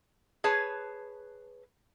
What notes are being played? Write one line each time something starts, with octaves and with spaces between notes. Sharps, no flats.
G#4 B4 C#5 A5